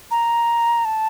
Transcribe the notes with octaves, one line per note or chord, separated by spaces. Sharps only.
A#5
A5